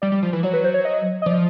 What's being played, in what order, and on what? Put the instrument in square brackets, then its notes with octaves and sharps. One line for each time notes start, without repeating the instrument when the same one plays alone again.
[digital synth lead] G3 [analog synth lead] D5
[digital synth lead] G3
F3
E3
[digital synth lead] F#3 [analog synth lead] C#5
[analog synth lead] B4
C5
C#5
D#5
D#5
[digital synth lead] F3 [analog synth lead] D5